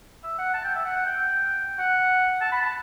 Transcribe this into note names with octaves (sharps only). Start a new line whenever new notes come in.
E5
F#5
A5
G5
E5
F#5
F#5
G5
F#5
A5
B5
A5